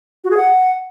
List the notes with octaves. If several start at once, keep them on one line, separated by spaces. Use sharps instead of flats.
F#4
G#4
F#5